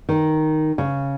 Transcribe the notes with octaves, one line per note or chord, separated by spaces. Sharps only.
D#3
C#3